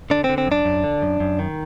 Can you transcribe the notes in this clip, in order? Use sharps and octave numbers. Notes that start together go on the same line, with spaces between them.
D3 D4
C4
D3
C4
F#2 D4
F#2
D3
F#2
F#2
D#3